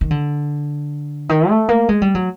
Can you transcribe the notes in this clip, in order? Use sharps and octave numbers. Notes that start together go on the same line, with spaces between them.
D#3
D3
D#3
A3
A#3
G#3
G3
F#3